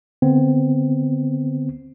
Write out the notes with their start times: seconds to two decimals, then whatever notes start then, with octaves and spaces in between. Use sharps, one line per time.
0.22 D3 B3 C4